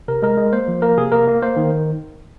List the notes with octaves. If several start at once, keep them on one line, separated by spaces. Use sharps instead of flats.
C3 A#4
G#3 A#4
G#3
A#3 C5
F3
A#3 A#4
C3 G#4
A#3 A#4
A#3
A#3 C5
D#3